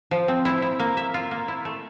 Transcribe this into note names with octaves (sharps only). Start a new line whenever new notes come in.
F3
C4
E4
E4
A#3
E5
F4
A#3
E4
A3